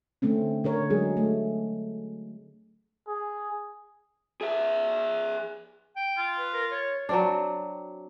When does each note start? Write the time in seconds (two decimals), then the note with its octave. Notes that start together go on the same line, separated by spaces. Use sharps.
0.22 D3 A3 C4 C#4
0.64 D3 A#4 C#5
0.90 F#3 G#3 G#4
1.17 A3
3.08 G#4
4.41 G#4 E5
5.96 G5
6.17 F4
6.38 B4
6.54 A#4
6.71 C#5
7.09 F#3 C4 D4